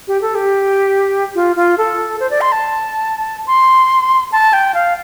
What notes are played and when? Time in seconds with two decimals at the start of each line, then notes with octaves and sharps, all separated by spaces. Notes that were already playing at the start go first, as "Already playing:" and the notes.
0.08 G4
0.21 A4
0.35 G4
1.35 F4
1.56 F4
1.78 A4
2.20 C5
2.30 D5
2.41 C6
2.52 A5
3.47 C6
4.32 A5
4.53 G5
4.74 F5